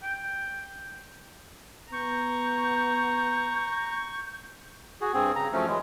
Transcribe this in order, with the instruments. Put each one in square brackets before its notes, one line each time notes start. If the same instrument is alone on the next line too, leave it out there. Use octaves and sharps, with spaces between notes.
[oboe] G5
[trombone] B3 [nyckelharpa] A#5 [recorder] C#6 [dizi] G6
[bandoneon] F#4 G#4
G2 C4 G#4
C#3 A#5
F3 F#3 A3 C#4
E3 F#3 G#3